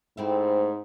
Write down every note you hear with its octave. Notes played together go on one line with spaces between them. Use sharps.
G#2 A3 C4 E4